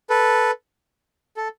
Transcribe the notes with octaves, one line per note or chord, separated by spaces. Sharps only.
A4 B4
A4